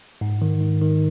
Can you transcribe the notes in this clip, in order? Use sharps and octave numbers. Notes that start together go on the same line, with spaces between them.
G#2
D#3
G#2
D#3